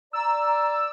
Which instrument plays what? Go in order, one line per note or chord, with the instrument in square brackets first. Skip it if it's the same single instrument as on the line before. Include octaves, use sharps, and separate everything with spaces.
[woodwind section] D5 [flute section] A#5 [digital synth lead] E6